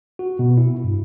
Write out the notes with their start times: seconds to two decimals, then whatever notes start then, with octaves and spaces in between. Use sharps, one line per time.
0.19 F#4
0.39 B2
0.58 E4
0.84 G2